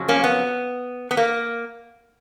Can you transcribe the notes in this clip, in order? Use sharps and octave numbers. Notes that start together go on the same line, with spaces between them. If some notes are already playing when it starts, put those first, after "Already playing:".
Already playing: F2 C#3 F#3
A#3 C#4
B3
B3
A#3